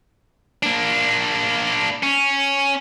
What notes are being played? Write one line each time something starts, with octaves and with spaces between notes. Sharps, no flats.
A#3 D4
C#4